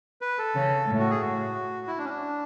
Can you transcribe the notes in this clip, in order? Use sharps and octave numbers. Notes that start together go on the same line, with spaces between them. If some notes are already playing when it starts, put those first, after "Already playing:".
B4
A4
C#3
A2
F#4
G#4
F#4
E4
D4
C#4
D4